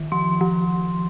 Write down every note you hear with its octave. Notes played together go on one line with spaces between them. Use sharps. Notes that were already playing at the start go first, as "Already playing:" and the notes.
Already playing: D#3
F3 C6
F3